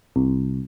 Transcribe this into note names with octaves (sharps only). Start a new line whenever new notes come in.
C2